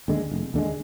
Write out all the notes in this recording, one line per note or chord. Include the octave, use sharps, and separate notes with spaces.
D#2 D3 G#3
F1
D#2 D3 G#3